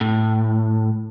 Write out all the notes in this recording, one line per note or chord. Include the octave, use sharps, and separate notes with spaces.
A2